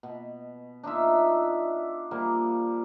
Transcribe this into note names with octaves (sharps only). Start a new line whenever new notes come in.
B2
D4 D#4 F4 E5
F3 G3 A#3